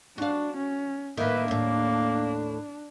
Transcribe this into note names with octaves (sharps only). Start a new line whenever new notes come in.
D4 F#4 F5
C#4
A2 D#3 A#3 B4 E5
D#2 A2 D4